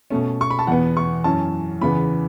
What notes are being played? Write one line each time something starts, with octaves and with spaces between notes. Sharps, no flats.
B2 A3 C#4
C#6
B5
A5
E2 B2 B3 F#5
C#6
F#2 E3 C#4 A5
E2 C#3 E3 B3 B5